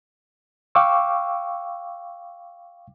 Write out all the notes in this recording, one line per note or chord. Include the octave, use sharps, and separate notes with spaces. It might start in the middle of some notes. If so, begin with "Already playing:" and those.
F5 G5 C#6 D6 E6